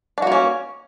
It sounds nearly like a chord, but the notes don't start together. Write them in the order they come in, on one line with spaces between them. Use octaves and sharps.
D4 F#4 A#3 C#4